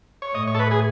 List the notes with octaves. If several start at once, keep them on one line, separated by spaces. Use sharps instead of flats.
C#5
A2 D#5
C#5
A4
B4
G#4